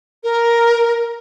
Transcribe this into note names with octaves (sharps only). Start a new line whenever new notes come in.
A#4